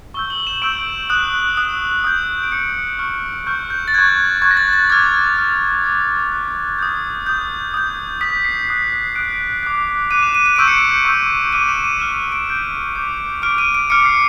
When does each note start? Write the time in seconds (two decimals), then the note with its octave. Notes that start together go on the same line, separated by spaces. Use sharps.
0.14 C#6 E6 G6 G7
0.30 F#7
0.47 E7
0.62 C#6 E6 G6 D7
1.10 D#6 F#6
1.57 D#6 F#6
2.04 D#6 G6
2.43 D7
2.52 D#6 G6 C#7
2.99 C#6 F6
3.47 C#6 F6 G6
3.70 G6
3.88 A6
3.94 C#6 F#6 G#6
4.42 C#6 F#6 G#6
4.51 A#6
4.57 A6
4.73 A6
4.90 D6 F6 G#6
5.37 D6 F6
5.84 D6 F#6
6.31 D6 F#6
6.79 D#6 G6
7.27 D#6 G6
7.74 D#6 G6
8.21 D#6 G6 B6
8.45 C7
8.68 D#6 F#6
9.15 D#6 F#6 D7
9.63 D6 F#6
10.11 D6 F#6 D#7
10.23 E7
10.35 D#7
10.46 D#7
10.56 C#6 E6 G6 D7
10.68 C#7
10.79 D7
11.05 C#6 E6 G6
11.52 D6 F6 D#7
11.69 E7
11.84 D#7
12.00 D6 F6 E7
12.16 D#7
12.32 D7
12.48 D6 G6
12.95 D6 G6
13.42 D6 F6 D7
13.58 D#7
13.75 D7
13.90 D6 F6 C#7
14.06 C7